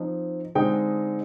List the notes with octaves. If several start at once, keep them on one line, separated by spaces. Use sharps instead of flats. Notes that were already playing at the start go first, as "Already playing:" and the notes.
Already playing: F3 C4 D#4
D3 G#3 C4 D#4 G5